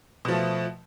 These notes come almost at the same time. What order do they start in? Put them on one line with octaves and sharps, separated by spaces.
B2 F3 A3